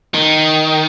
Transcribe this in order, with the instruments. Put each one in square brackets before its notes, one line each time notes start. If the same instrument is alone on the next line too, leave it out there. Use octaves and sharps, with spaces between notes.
[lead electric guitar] D#3